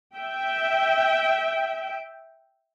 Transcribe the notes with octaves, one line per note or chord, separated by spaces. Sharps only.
E5 G5